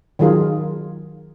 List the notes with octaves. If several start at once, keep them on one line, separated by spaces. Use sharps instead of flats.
D#3 F#3 F4 G#4 A#4